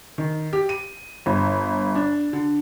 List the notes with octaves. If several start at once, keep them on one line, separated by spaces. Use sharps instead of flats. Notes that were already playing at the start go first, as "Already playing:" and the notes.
D#3
G4
D#7
G1
D4
D3